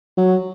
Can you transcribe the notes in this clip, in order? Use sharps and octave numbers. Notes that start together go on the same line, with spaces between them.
F#3